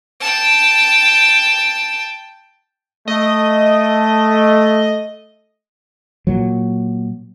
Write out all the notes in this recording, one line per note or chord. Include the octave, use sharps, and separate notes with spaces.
G5 A5
A3 D#5
A#2 F#3